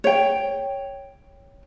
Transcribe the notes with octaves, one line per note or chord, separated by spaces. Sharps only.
C#5 G5